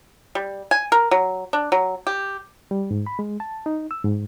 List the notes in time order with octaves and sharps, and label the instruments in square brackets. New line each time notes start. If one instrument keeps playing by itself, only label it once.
[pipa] G3
G#5
A#4
F#3
D4
F#3
G4
[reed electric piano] G3
G#2
B5
G#3
A5
D#4
E6
G#2